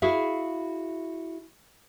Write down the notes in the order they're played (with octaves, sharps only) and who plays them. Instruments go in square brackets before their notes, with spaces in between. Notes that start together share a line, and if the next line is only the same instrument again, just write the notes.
[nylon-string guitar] E4 F#4 G#4 E5 F5